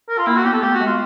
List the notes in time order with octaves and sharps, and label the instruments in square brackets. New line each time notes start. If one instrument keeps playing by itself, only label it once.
[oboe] A#4
F4
[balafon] A#3 [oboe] E4
[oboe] F#4
[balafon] B3 [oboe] G4
[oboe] A4
[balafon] A3 [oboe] G4
[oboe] F#4
[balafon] G#3
[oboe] F4